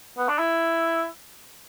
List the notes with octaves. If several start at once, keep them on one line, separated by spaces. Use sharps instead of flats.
B3
D4
E4